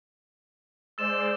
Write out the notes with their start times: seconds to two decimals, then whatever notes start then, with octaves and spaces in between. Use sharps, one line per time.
0.98 G#3 C5 D5 E6 A6 E7